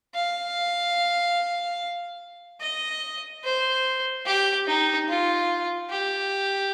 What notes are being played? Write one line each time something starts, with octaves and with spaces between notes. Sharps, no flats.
F5
D#5
C5
G4
D#4
F4
G4